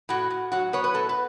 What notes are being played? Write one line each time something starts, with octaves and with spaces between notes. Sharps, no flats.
A2 F#4
A2
F#3 F#4
B3 C#5
B4
A2 A4
B4